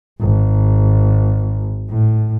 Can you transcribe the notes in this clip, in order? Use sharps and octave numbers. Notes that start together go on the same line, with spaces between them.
G#1
A2